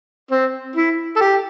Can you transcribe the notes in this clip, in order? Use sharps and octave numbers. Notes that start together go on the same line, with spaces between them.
C4
E4
A4
G4